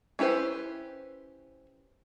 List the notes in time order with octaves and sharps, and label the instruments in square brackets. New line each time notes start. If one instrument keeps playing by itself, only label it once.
[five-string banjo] C#4 E4 G4 B4 C5